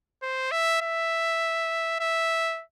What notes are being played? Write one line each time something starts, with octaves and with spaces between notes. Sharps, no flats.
C5
E5
E5
E5